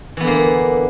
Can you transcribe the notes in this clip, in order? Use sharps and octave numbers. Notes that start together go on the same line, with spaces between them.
D3 E3 A#3 B3